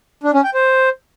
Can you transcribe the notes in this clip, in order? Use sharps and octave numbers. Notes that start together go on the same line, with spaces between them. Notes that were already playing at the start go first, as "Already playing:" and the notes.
D4
C#4
G5
C5